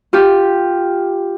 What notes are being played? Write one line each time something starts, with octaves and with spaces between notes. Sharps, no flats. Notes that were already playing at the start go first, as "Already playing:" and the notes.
F4 G4